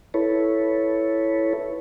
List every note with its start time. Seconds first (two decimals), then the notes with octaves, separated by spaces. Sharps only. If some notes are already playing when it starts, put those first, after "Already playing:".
0.14 E4 A4 B4 C#5